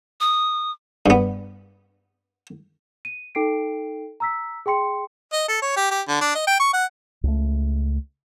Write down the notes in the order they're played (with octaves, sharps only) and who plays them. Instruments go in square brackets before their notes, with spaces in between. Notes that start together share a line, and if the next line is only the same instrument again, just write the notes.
[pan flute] D#6
[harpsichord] G2 B3
[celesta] D#7
D#4 A4 G5 C7 D7
A#5 E6 B6
G#4 G5 C6 C#7
[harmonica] D#5
A4
C#5
G4
G4
D3
D4
D#5
G5
C#6
F#5
[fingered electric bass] C#2 A3